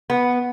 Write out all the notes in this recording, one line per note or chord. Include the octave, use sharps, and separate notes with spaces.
B3